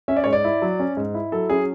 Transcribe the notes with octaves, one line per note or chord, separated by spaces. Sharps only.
C#4 E5
D5
G#2 C#5
D5
E4
F#3
C#4
G#2
E4
F#3 A4
C#4 G#4